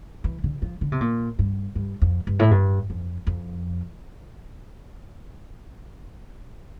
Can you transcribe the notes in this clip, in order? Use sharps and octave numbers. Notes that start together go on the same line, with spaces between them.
E3
D3
F3
D3
C3
A#2
G2
G2
F2
G2
A2
G2
F2
F2